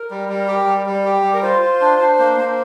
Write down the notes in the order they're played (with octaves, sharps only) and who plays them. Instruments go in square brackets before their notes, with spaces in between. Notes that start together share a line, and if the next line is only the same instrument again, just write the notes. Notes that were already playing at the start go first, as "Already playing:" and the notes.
Already playing: [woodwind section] A#4
[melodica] G3
G3
G4
G3
G3
G4
G3
[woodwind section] A#4
[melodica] F4 [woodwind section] C5
[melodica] F4
D4
D4
A#3
A#3